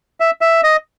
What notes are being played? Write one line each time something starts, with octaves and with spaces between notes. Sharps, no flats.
E5
E5
D#5